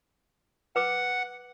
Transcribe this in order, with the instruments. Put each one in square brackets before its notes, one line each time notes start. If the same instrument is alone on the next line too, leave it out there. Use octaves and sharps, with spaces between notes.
[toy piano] B4 D6 [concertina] F#5